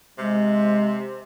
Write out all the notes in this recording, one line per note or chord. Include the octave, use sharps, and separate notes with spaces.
C3 G#3